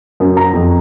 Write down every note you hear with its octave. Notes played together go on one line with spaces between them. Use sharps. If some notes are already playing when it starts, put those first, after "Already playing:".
F#2
A#5
F2